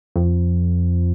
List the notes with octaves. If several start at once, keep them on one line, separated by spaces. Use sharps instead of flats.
F2